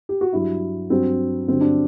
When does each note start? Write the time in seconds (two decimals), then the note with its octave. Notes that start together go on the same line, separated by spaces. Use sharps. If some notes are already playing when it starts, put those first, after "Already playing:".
0.09 G4
0.21 F#4
0.33 G2 F#3 E4
0.90 G2 F#3 C4
1.48 G2 D3 F#3 C4
1.61 D4